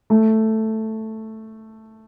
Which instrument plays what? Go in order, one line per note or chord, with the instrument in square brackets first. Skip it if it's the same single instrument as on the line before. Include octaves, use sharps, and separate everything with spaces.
[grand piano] A3